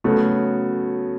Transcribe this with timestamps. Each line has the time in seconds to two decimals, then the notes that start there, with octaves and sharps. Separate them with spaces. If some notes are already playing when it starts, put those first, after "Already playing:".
0.04 C#3 F#3 A3 B3 F#4 C#5